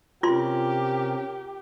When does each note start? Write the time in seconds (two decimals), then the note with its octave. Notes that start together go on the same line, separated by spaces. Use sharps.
0.23 C3 C#4 F4 G4 A#4 C6